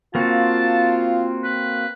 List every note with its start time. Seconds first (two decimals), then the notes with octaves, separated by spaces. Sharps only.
0.15 A#3 C4 F4 F#4 A5
1.44 B4